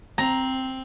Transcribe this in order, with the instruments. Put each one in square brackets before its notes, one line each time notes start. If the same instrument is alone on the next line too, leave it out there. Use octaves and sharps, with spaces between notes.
[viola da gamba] C4 [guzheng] A#5